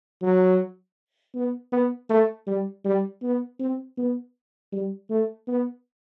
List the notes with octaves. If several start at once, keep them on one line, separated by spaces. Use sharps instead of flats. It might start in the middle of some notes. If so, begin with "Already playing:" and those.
F#3
B3
B3
A3
G3
G3
B3
C4
B3
G3
A3
B3